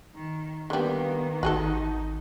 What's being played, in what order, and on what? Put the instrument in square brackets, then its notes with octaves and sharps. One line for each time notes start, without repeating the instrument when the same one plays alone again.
[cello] D#3
[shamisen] D3 G3 [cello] D#3 [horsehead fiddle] A#3 B3
[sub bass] G#1 [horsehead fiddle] D#4 [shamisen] F#4 G#4 A4